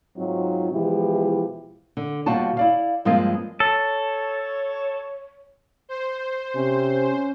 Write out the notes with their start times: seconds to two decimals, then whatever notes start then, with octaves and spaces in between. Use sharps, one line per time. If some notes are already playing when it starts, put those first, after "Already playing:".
0.17 G#2 F#3 C4 D#4 F4
0.72 B2 E3 F3 G#3 E4 G4
1.97 D3
2.26 D#2 B2 G3 F4 F#4 A5
2.57 E4 D5 F5
3.05 G2 F3 G#3 A#3 C4 F4
3.60 A4 C#5
5.89 C5
6.55 C3 C#4